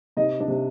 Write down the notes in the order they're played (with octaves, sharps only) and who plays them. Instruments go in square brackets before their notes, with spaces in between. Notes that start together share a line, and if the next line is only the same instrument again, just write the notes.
[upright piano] C3 D#4 D#5
D4 D5
C3